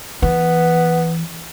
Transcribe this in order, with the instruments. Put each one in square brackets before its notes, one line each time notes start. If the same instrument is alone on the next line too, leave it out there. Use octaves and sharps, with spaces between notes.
[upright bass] E3 [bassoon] B3